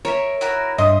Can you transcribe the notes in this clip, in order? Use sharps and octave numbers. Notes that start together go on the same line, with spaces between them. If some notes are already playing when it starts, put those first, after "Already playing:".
A#4 C#5 E5
E4 F#4 A#4
G2 D#5 E5 C6 D#6